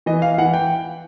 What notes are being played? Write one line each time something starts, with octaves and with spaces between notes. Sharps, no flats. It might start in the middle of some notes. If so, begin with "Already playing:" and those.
E3 D#5
F5
E3 F#5
G5